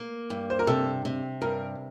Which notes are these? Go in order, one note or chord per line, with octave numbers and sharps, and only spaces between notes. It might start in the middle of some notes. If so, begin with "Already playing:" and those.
Already playing: A#3
G2
C5
A#4
C3 A4
C3
G2 A#4